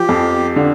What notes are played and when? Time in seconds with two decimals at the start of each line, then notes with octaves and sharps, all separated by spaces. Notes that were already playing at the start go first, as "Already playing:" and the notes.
Already playing: F3 G4
0.09 F2
0.56 D3